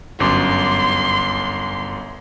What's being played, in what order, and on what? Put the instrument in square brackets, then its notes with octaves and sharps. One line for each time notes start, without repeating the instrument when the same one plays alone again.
[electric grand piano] G1 F#2 D6 [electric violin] C6